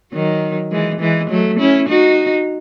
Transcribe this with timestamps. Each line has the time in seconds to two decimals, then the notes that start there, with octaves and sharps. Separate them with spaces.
0.13 D#3 F#3
0.71 E3 G#3
1.00 E3 G#3
1.30 F#3 A3
1.59 C#4 E4
1.89 D#4 F#4